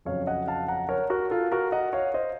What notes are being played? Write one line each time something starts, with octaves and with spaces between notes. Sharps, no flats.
F2 C#3 F#3 C#5 F5
D#5 F#5
F5 A5
F#5 A#5
A#4 C#5
F#4 A#4
F4 A4
F#4 A#4
D#5 F#5
C#5 F5
C5 D#5